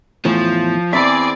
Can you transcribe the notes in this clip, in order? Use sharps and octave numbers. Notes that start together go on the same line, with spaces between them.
E2 A2 F3
E2 C4 G#4 D5 E5 B5